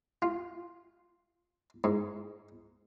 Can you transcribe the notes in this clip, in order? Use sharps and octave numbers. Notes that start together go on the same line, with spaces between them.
F4
G#2